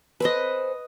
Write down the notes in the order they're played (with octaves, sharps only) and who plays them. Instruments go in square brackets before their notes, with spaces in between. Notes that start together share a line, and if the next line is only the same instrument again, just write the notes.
[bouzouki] C4 A4 C5 [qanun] B4 D#5